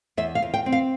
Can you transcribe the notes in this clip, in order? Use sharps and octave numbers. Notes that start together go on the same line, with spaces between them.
E2 E5
F5
E2
G5
C4
F5